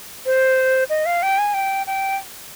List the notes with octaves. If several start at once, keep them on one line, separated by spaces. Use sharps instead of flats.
C5
D#5
F5
G5
G#5
G5
G5